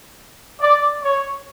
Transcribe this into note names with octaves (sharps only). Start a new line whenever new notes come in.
D5
C#5